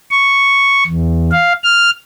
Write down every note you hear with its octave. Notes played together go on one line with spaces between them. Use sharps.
C#6
E2
F5
F6